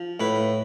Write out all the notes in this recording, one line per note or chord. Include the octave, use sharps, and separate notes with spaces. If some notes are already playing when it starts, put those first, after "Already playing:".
Already playing: F3
A2 B4